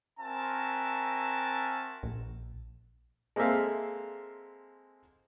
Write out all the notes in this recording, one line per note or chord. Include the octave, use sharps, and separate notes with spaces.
C4 F#4 A#4 E5 G#5 A5
A#1
G#3 A#3 C4 A4 E5 F5